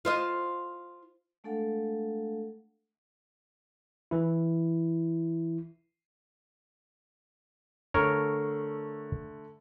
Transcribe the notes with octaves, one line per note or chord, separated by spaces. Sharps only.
F4 C5 D#5
G#3 A3 D4 A4 F5 F#5
E3 E4
D3 A3 A#4 C#5